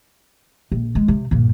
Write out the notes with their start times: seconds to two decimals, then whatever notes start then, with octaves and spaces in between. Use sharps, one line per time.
0.72 A#1
0.95 G#3
1.08 C3
1.31 G2 A#2